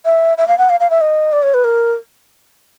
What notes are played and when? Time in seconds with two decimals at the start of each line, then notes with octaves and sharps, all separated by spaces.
0.05 E5
0.38 E5
0.48 F5
0.58 F#5
0.70 F5
0.80 F5
0.90 E5
1.01 D#5
1.32 D5
1.43 C#5
1.54 B4
1.64 A#4